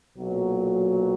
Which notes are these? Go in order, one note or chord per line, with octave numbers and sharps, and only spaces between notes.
B1 A#2 F#3